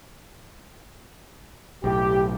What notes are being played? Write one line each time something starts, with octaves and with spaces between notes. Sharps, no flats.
B1 A2 G4